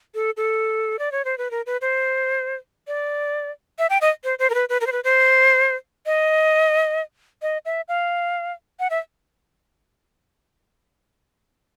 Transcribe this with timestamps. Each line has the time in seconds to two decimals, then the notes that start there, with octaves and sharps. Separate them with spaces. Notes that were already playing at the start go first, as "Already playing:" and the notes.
0.15 A4
0.37 A4
0.99 D5
1.12 C#5
1.25 C5
1.38 B4
1.51 A#4
1.66 B4
1.81 C5
2.87 D5
3.79 E5
3.90 G5
4.01 D#5
4.24 C5
4.39 C5
4.50 A#4
4.54 B4
4.69 B4
4.81 A#4
4.87 C5
4.92 B4
5.04 C5
6.06 D#5
7.42 D#5
7.65 E5
7.88 F5
8.80 F#5
8.90 E5